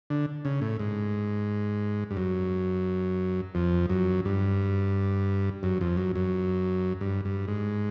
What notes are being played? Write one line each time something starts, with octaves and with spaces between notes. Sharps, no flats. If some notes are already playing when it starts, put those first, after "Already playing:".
D3
C#3
A2
G#2
G2
F#2
F2
F#2
G2
F#2
F2
F#2
F#2
G2
G2
G#2